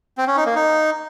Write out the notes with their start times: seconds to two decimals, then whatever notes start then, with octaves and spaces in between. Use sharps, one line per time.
0.18 C4
0.27 C#4
0.37 D#4
0.46 A#3
0.56 D#4